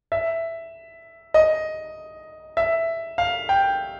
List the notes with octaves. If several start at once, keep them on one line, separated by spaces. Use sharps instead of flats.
E5
D#5
E5
F5
G5